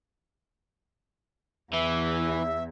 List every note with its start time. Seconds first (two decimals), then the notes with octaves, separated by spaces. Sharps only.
1.73 E2 E3 E5